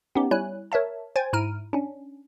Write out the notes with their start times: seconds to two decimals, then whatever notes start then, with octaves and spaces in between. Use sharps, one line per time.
0.15 B3 C#4 D#4 G4
0.31 G3 E4 C#5 G#5 F#6
0.72 A#4 C#5 E5 A5
1.16 C5 G5 G#5 G#6 A6
1.33 G#2 E4 A#5 F6 D7 D#7
1.73 C#4 D4